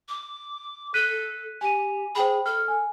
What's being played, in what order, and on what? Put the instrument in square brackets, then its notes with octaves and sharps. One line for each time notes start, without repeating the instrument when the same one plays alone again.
[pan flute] D6
[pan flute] A4 [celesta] F#6 B6 D#7
[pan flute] G4 [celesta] G#5 D#7
[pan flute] G#4 [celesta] C5 G5 B5
[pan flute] A4 [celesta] F6
[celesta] G#5